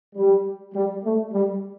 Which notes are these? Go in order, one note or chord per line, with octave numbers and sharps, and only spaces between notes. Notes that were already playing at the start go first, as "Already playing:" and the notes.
G3
G3
A3
G3